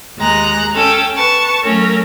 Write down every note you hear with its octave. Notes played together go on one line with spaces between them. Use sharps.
D#2 G#3 A#5 F#6
C#4 A4 G5
B4 A5 C#6
F#3 A3 C#4 A#4